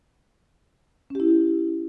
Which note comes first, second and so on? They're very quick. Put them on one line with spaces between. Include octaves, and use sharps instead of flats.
C#4 G4 E4